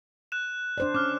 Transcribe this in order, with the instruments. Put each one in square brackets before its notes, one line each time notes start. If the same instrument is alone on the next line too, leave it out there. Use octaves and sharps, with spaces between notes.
[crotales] F#6 E7
[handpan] D4 C5 D5
[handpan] C#4 [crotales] D6 F6